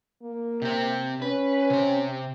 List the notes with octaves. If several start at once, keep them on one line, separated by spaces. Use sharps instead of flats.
A#3
C3 C4
C#4 B4
C3 C5